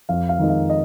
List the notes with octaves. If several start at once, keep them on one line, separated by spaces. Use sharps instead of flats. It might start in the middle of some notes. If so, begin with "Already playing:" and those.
F2 F5
F5
D#3 G#3 D#4
F5
D#5